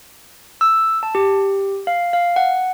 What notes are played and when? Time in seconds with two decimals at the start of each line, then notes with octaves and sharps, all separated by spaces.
0.61 E6
1.03 A5
1.15 G4
1.87 F5
2.13 F5
2.36 F#5